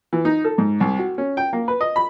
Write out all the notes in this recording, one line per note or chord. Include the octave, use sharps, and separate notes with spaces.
E3
D#4
A4
G#2
C2
F#4
C#4
G5
A#3
B4
D#5
B5